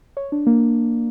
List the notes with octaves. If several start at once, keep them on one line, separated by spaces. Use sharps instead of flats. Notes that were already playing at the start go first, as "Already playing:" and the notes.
C#5
D4
A#3